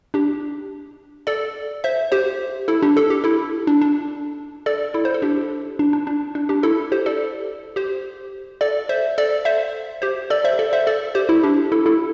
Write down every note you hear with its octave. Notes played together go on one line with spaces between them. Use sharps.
D4 G4
A4 D5
C5 E5
G4 C5
E4 A4
D4 G4
A4
G4
E4 A4
D4
D4
A4 D5
E4 A4
C5
A4
D4 G4
D4
D4
D4
D4
D4 G4
E4 A4
G4 C5
A4 D5
G4 C5
A4 D5
C5 E5
A4 D5
C5 E5
G4 C5
A4 D5
C5 E5
A4 D5
C5 E5
A4 D5
G4 C5
E4 A4
D4 G4
E4 A4
E4 A4